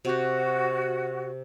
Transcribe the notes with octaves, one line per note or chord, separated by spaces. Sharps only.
C3 F#4 G4